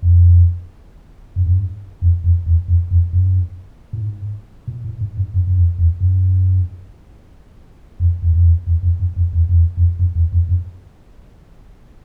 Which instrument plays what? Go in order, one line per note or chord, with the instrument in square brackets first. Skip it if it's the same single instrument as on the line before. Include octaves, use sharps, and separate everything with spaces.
[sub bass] F2
F#2
F#2
G2
F2
F2
E2
F2
F2
F#2
A2
G#2
A#2
A2
G#2
G2
F#2
F#2
F2
E2
F#2
F2
E2
F2
E2
E2
F2
F#2
F2
E2
F2
E2
F2
F#2
E2
F2
F#2